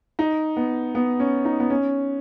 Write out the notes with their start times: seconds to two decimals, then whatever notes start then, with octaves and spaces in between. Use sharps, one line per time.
0.19 D#4
0.57 B3
0.95 B3
1.20 C#4
1.45 D#4
1.60 B3
1.70 C#4